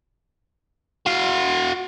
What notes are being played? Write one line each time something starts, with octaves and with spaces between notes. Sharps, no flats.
F#4 F5